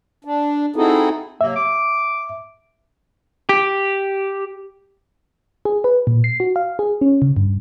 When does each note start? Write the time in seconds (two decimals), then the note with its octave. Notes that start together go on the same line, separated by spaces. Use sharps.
0.25 D4
0.76 C4 D#4 E4 F#4 G#4 A4
1.41 C3 F#3 A#3 E5
1.56 D6
3.49 G4
5.65 G#4
5.84 B4
6.07 A#2
6.24 C7
6.40 F#4
6.56 F5
6.79 G#4
7.01 C#4
7.22 C#3
7.37 G2